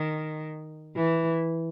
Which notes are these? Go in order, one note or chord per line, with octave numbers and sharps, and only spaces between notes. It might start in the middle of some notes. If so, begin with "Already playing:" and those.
Already playing: D#3
E3